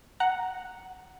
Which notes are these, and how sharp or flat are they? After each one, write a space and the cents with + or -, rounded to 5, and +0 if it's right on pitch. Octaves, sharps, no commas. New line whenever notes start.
F#5 +0 A#5 +0